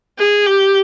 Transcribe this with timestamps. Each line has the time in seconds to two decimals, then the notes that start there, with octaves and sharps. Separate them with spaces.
0.18 G#4
0.47 G4